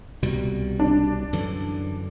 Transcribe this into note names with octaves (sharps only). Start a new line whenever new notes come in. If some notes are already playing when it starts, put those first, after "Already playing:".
C2 B2 G3
D4
F#2 D3 E3